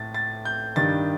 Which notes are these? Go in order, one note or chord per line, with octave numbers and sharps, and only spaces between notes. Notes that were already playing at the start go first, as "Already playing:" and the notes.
Already playing: A2 A3 A6
A6
G6
G2 D#3 G3 A6